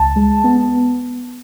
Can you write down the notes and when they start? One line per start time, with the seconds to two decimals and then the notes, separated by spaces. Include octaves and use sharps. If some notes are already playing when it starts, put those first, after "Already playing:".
Already playing: C#2 A5
0.16 G#3
0.44 B3